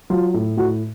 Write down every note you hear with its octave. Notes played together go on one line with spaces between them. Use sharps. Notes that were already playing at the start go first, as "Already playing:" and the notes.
F#3 F4
A2
A2 F#4